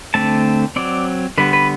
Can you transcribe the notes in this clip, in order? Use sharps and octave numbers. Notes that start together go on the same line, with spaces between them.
D3 A3 C4 A5
F#3 C4 D5
D3 G3 B3 B4
B4